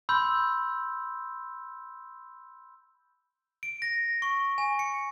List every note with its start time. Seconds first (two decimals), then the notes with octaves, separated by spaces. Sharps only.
0.09 B5 C6 E6 G6
3.63 D7
3.82 A#6
4.22 C#6
4.58 G#5
4.79 C#7